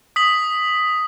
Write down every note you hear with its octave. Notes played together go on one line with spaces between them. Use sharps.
D#6 B6 F#7